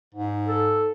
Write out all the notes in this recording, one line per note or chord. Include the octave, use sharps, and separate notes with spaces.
G#2
A4